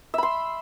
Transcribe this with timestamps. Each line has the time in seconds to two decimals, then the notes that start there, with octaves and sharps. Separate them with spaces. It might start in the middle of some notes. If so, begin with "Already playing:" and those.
0.14 E5
0.18 B5
0.23 C6